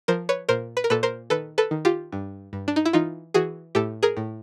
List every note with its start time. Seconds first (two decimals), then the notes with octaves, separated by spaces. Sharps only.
0.08 F3 A#4 C5
0.29 B4 C#5
0.49 A#2 A#4 C5
0.77 B4
0.84 A#4
0.90 A#2 A4 B4
1.03 A#4 C5
1.30 D#3 A4 B4
1.58 A4 B4
1.71 D#3
1.85 F4 G4
2.12 G2
2.53 G2
2.68 D4
2.76 D#4
2.85 E4
2.93 E3 D#4 F4
3.34 E3 F#4 G#4
3.75 A2 G4 A4
4.03 G#4 A#4
4.17 A2